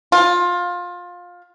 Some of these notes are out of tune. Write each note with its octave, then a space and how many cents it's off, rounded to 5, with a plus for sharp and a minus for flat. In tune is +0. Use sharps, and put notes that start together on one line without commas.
F4 +20